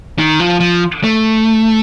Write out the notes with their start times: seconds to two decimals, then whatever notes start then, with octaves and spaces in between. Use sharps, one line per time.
0.18 D#3
0.40 F3
0.60 F3
1.04 A3